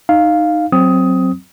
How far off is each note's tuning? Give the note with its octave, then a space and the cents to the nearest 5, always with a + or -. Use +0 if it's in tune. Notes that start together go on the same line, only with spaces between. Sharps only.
D#4 -5 F5 +0
F#3 +0 C4 +0 D#6 +15